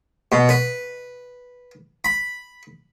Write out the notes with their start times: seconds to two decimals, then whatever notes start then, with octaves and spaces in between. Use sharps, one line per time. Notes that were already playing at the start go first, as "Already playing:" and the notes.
0.32 B2
0.49 B4
2.05 B5